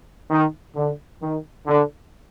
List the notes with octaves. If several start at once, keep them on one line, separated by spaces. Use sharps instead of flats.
D#3
D3
D#3
D3